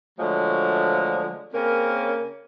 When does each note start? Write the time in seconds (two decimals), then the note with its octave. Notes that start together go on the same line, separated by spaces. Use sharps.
0.19 D3 F3 F#3 G#3 A3
1.54 C#3 A#3 C4 C#4 A#4